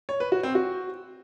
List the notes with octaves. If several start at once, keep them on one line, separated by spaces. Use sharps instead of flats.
C#5
B4
F#4
C4
F#4